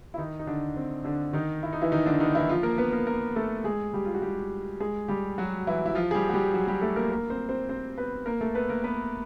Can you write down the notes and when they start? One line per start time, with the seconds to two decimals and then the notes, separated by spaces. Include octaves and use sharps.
0.14 E4
0.18 D#3 D#4
0.39 D#4
0.47 D3 D4
0.76 C4
1.05 D3 D4
1.33 D#3 D#4
1.63 E4
1.73 D#4
1.82 E3 E4
1.92 D#3 D#4
2.06 D3 D4
2.20 D#3 D#4
2.35 E3 E4
2.49 F3 F4
2.63 A#3 A#4
2.78 B3 B4
2.92 A#3 A#4
3.07 A#3 A#4
3.36 A3 A4
3.64 G#3 G#4
3.93 G3 G4
4.05 F4
4.14 F#4
4.22 G3 G4
4.80 G#3 G#4
5.08 G3 G4
5.38 F#3 F#4
5.67 E3 E4
5.86 E4
5.95 F3 F4
6.11 G#4
6.14 G3 G4
6.29 F#4
6.33 G3 G4
6.54 F#3 F#4
6.67 G3 G4
6.82 A3 A4
6.96 A#3 A#4
7.11 A#3 A#4
7.30 C4 C5
7.49 C4 C5
7.69 C4 C5
7.98 B3 B4
8.26 A#3 A#4
8.41 A3 A4
8.55 B3 B4
8.69 A#3 A#4
8.84 B3 B4